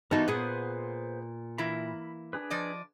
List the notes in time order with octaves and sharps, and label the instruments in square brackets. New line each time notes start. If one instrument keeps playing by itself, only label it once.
[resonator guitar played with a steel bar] E3 G3 F#4 [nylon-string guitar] B3 D#4 [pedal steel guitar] A#4 A5 A#5
[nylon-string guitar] A#2 [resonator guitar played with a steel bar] B3 G#4 F#5 [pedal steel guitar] B4 C5
[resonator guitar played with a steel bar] E3 A#3 E4 [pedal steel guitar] B5
[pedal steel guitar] D4 G#4 B4
[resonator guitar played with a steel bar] F3 D5 D#5